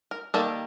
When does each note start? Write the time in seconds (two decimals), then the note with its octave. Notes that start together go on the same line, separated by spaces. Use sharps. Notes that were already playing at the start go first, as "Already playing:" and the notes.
0.11 A#4
0.34 D#3 G3 A#3 A4